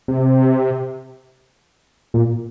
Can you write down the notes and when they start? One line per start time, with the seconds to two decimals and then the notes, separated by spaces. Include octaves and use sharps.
0.08 C3
2.14 A#2